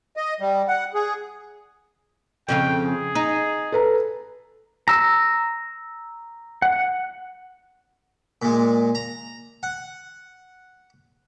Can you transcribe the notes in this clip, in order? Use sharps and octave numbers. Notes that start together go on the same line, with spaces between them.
D#5
G3
F#5
G#4
F2 C#3 F4 G5
G#4
D#4
A4 B4 A#5
A#5 E6
F#5
A#2 G#3
A#5
F#5